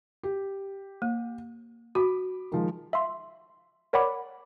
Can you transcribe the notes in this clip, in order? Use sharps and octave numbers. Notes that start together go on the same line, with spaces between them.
G4
A#3
F#4 B5 D6
D#3 F3 G#3
E5 F5 C6
A#4 C#5 D5 F#5 B5 D6